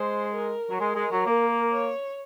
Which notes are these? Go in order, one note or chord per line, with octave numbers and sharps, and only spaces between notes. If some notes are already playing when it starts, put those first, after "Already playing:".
Already playing: G#3 C5
A#4
F#3
G#3 A#4
G#3
F#3
A#3
C#5